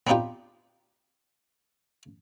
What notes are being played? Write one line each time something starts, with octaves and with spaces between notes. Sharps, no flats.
B3 C4 D4 D#4 F4 G4